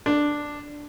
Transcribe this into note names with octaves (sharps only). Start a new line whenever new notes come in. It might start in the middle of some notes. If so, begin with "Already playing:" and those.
D4